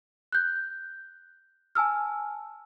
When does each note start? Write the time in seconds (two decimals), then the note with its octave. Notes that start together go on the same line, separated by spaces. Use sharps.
0.32 F#6 G6
1.75 G#5 A5 E6 F6